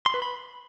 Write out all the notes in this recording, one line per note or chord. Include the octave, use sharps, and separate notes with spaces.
C6
B4
B5